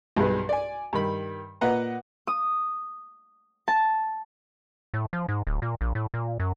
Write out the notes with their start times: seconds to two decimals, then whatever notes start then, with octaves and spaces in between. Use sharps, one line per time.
0.16 B1 G2 G#3 B4
0.49 D5 G#5
0.93 G2 D#3 B5
1.61 A#2 B4 D#5 F#5 A#5
2.27 D#6
3.68 A5
4.94 A2
5.13 F3
5.29 G#2
5.47 D1
5.62 A#2
5.81 A#1
5.95 A2
6.14 A#2
6.40 F#2